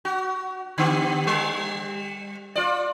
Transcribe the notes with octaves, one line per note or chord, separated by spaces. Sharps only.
F#4
D3 B3 G4
G3
F4 D5